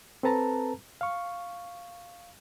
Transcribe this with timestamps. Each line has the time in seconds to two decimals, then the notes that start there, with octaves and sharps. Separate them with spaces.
0.23 C4 A4 B4 A5 A#5
1.01 F5 C#6